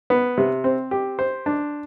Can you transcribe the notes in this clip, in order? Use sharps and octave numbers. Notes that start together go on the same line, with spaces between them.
B3
C3
C4
G4
C5
D4